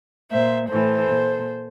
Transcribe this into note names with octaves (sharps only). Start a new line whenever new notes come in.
A#2 C5 E5
A2 E3 A4 C5
A#2